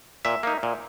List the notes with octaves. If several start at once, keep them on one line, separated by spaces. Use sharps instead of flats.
A#2 E5
A#3 D#4
A#2